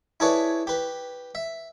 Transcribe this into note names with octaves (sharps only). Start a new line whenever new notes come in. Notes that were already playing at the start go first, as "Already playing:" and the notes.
E4 G#4 A4 B4 C#5 D5
G4 B4
E5